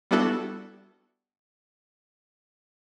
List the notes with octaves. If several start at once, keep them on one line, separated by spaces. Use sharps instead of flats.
G3 B3 D4 E4 F#4 A4